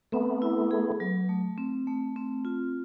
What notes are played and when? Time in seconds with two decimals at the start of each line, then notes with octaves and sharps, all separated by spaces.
0.12 A3 B3 C4
0.42 E4
0.71 G#4
1.00 F#3
1.29 A3
1.58 C4
1.87 A3
2.16 C4
2.45 F4